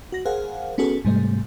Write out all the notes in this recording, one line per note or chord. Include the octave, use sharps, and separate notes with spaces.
F#4 A#6
G#4 A#4 C5 F5 F#5 G#5
B3 C#4 F#4 G#4 A4
G#2 C3 G3 A3